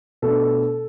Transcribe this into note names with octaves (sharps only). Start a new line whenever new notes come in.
B2 A3 D4 A4